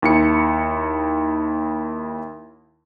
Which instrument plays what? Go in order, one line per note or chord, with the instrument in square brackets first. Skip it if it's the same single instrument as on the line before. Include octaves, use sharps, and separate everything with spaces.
[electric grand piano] D#2 E4 C#7